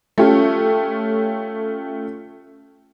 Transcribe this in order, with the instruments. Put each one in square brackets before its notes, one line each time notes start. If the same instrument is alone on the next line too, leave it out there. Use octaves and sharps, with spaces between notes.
[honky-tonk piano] A3 C#4 F4 G4